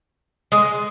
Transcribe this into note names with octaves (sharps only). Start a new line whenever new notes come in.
G#3